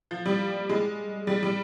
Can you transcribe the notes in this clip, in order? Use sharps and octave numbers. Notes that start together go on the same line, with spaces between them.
F3
G3
G#3
G3
G3